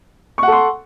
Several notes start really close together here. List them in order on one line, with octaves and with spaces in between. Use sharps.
C#6 F#5 A4 C6